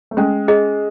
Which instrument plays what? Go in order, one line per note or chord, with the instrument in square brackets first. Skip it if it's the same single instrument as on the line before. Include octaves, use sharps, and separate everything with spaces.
[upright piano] A3
[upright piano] G#3 [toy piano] C#4
[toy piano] G#4 D#5